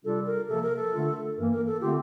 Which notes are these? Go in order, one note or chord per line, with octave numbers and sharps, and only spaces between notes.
C3 G3 D4 F4 A4
A#4
C3 F3 A#3 A4
A#4
A4
D3 A3 D4 F4
G2 E3 A#3 A#4
A#4
A4
D3 A3 C4 F4 G4